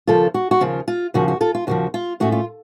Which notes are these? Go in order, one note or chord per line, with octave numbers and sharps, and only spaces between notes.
D#2 C#3 F3 F4 A4
F#4
F#4
D#2 C#3 F3 F4
F4
D#2 C#3 F3 F#4
F#4
F4 A4
F4
D#2 C#3 F3 F#4
F4
A2 A3 C#4 F#4
F4